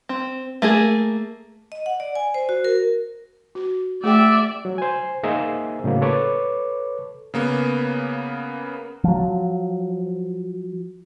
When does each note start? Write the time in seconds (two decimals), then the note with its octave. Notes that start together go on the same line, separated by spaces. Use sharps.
0.09 C4
0.62 A3 A#3 G#4
1.72 D#5
1.86 F#5
2.00 D5
2.15 G#5
2.34 C5
2.49 F#4
2.64 A#4
3.55 F#4
4.04 A3 G#4 D5 E5 G5
4.65 F#3
4.78 C5 G#5
5.23 A#3 D#4 G#4 C5 D#5 E5
5.84 A2 C#3 F#3 A#3
6.02 A4 B4 C#5 D6
7.34 C#3 A#3 B3
9.04 F3 F#3